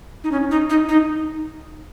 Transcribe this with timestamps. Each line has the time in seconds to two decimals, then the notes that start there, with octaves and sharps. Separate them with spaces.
0.24 D#4
0.31 C#4
0.51 D#4
0.70 D#4
0.88 D#4